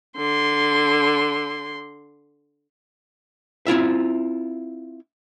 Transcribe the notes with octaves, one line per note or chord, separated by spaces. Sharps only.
D3 C6
C4 E4 F4 E5